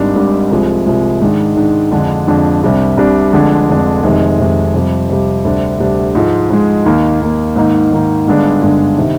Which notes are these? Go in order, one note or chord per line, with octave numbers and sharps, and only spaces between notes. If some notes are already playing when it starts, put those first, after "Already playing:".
Already playing: G#1 G#2 G3 D4
G#1 G#2 G3 D4
C2 C3 F3 G#3
C2 C3 F3 G#3
G#2 D#3 G#3 D4
G#2 D#3 G#3 D4
F2 D3 G#3 D4
F2 D3 G#3 D4
C2 C3 G3 D4
C2 C3 G3 D4
F1 F2 D3 G#3 D4
F1 F2 D3 G#3 D4
F1 F2 C3 D#3 G#3
F1 F2 C3 D#3 G#3
F2 C3 G3
F2 C3 G3
D2 C3 G3 D4
D2 C3 G3 D4
G#2 F3 G#3
G#2 F3 G#3
D#2 D#3 A#3
D#2 D#3 A#3
G#2 D#3 A#3 D#4
G#2 D#3 A#3 D#4
G1 G2 D3 G#3 D4
G1 G2 D3 G#3 D4
C3 D#3